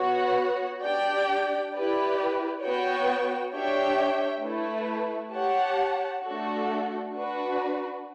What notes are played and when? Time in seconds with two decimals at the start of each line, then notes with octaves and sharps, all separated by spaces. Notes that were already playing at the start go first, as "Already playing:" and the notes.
Already playing: B3 F#4 C#5 F#5
0.83 D4 G4 D5 G5
1.73 E4 G4 B4 D5
2.63 B3 F#4 C#5 G5
3.53 D4 G4 C#5 E5 G5
4.43 A3 E4 B4
5.34 G4 C#5 F#5 A5
6.24 A3 D4 F#4 A4
7.14 D4 F#4 B4